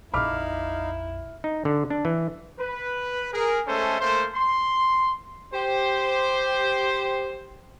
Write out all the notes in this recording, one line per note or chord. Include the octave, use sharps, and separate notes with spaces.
A#1 F2 D#4 E4 F5 B5 D6 F6
D#4
D3
D4
E3
B4
G#4 A#4
G#3 A3 C#4 A4 C5
A3 A#3 C5
C6
G4 C5